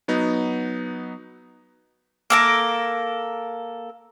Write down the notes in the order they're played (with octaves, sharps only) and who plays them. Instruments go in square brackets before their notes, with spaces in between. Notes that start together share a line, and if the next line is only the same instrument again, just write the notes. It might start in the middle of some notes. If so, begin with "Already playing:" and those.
[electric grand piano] F#3 B3 D#4
[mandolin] A#3 A4 A#4